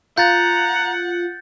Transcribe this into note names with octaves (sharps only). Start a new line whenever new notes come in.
F4 F#5 A#5 G6 A6